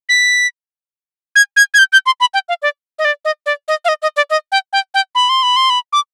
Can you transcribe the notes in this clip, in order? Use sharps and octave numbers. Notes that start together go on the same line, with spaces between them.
B6
G#6
G#6
G#6
G6
G6
C6
B5
G5
F5
D5
D#5
D5
D#5
D5
D#5
F5
D#5
D#5
D5
D#5
G5
G5
G5
B5
C6
B5
C6
B5
D6